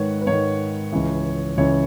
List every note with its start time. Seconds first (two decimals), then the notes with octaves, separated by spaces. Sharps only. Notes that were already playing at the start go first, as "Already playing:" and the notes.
Already playing: G#2 D#3 B4 C#5
0.21 B4
0.27 G#2 D#3 C#5
0.92 C#2 C#3 E3
1.57 C#2 C#3 E3 C#5